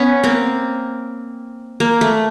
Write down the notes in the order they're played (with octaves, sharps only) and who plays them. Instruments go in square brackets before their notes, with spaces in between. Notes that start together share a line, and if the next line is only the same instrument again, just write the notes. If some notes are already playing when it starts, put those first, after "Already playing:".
Already playing: [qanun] B3 C#4
A#3 C4
A#3
A3